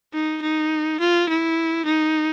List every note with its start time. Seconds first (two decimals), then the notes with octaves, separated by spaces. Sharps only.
0.13 D#4
0.42 D#4
1.00 F4
1.29 E4
1.86 D#4